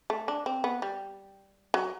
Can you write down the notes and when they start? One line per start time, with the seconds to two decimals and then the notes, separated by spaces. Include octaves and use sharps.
0.10 A3
0.28 D4
0.46 C4
0.64 B3
0.82 G3
1.74 F#3